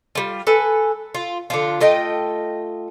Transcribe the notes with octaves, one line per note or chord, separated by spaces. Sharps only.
G3 F4
A4 B4 G#5
F4
D3 F3 F4
A3 F4 D#5 G5